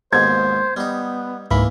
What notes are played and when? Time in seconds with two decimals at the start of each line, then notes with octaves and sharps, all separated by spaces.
0.13 D#2 G#2 B2 C5 G#6
0.77 G3 B3 D#4
1.51 C#2 G#2 E3 A#3 B5